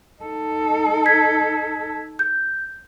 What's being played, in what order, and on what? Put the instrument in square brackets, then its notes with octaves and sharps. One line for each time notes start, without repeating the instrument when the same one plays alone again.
[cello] D#4 A4
[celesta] G#6 B6
G6